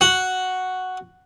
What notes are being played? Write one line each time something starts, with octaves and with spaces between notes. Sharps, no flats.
F#4